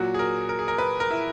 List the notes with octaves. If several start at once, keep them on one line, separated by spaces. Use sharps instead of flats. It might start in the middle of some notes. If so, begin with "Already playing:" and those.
Already playing: A#2 F#3 F#4
G#4
A#4
A#4
G#4
A#4
B4
A#4
E4